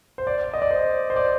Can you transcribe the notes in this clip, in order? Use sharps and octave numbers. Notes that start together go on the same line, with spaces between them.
C5
D5
D#5
D5
C5
C5
D5